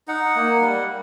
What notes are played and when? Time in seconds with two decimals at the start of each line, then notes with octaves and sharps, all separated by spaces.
0.08 D#4 F#5
0.35 A#3
0.61 G3